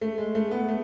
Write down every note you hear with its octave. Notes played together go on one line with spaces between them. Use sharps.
A3
G#3
A3
B3
A3